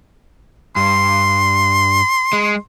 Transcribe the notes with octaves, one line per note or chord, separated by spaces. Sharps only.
G2 C6
G#3